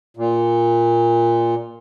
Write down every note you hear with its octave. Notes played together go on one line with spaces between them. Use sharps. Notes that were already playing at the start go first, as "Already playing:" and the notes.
A#2